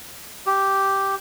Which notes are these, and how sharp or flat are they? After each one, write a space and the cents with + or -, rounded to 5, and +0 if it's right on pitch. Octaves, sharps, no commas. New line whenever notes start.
G4 -5